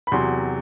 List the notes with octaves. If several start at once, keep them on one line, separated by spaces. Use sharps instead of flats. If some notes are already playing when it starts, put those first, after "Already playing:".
B5
E2 C3 F#3 C6